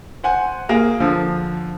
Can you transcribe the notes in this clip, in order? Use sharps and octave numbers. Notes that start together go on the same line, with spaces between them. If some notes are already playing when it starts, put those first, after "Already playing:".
C5 F#5 G#5
A#3 G#4 F5
D3 F3